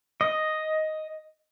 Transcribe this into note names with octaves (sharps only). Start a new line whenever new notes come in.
D#5